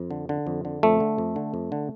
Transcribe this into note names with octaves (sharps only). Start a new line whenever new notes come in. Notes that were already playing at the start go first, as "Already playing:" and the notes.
Already playing: F2
D3
D3
F2
D3
F2 A3
D3
F2
D3
F2
D3